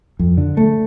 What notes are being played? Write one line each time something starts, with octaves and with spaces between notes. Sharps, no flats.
F2
D3
A3